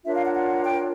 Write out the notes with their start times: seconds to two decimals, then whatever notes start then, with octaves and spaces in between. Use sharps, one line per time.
0.04 D4 F4 A#4 C#5 E5
0.14 F5
0.24 F#5
0.34 F#5
0.65 G5